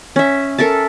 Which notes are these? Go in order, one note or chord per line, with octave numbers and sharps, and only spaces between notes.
C#4 E5
A4 A#4 E5 A5